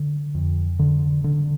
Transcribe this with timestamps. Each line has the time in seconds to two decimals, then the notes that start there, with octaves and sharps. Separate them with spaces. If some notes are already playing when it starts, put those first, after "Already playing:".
Already playing: D3
0.35 F2
0.79 D3
1.24 D3